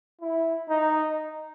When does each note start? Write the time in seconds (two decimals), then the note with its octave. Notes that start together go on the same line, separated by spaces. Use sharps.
0.21 E4
0.69 D#4